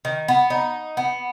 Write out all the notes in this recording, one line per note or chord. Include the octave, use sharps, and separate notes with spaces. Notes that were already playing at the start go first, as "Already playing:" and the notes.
D#3
B3
D#4
B3